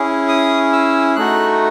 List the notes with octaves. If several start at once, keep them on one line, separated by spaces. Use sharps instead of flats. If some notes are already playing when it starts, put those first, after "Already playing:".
Already playing: C#4 E4 G#4
D#6
E6
A3 D#4 F#4 F#6